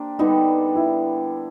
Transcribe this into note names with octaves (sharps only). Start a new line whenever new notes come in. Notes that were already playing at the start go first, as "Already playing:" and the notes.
Already playing: A#3 D4 G4 C5
D3 G3 B3 D#4
E4